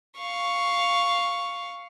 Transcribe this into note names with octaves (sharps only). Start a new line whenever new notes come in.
F5 C#6